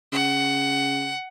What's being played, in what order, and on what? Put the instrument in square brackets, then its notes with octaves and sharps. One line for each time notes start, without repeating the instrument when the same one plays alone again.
[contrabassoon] C#3 [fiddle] F#5